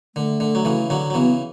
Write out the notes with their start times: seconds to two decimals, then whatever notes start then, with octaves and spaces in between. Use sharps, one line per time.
0.15 D3 A3
0.40 D3
0.55 F#3
0.65 C#3 E3
0.90 D3 F#3
1.10 F#3
1.14 C#3 E3 B3